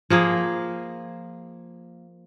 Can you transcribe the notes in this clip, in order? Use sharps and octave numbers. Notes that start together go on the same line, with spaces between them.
F3 A#3 G#4